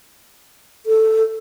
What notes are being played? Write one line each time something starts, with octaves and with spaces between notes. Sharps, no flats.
A4